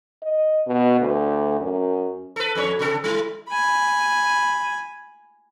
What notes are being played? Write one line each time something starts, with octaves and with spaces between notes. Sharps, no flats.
D#5
B2
D2
F#2
A4 B4
F2 D4 C#5
C3 A4
G3 E4
G#5 B5